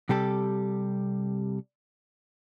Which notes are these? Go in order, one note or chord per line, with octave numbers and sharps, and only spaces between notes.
C3 G3 G4 A4